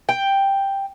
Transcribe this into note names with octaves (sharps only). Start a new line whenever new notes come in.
G5